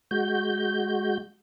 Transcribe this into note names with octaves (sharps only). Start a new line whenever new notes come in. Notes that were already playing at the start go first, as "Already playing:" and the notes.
G#3 F#4 G6